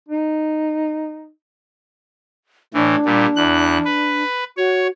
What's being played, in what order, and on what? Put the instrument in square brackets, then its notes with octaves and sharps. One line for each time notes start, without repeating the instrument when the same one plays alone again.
[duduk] D#4
[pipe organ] A2 E3 [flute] D4
[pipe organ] A#2 G3
E2 F#6
B4
[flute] F#4 [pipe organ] C#5